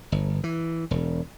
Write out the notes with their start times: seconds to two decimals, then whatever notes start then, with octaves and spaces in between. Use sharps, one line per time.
0.12 G1
0.44 E3
0.91 E1